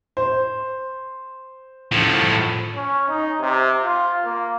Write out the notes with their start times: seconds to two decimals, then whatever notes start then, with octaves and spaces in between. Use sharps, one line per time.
0.17 C5
1.92 A2 F3
2.76 C#4
3.09 D#4
3.40 C3
3.84 F4
4.25 A#3